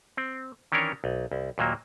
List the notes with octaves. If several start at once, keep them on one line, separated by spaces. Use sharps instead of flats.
C4
D#3 E3 C#4 D4 A#4 C#5
B1
C2
D#2 A#2 F#3 A#3